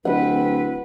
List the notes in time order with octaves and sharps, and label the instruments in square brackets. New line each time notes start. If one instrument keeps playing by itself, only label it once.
[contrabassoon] D1 [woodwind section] C4 B4 [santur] F#5